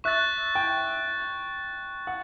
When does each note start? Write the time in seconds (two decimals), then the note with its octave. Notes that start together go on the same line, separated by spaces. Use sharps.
0.04 E5 C#6 F#6 A6
0.55 G5
2.07 F#5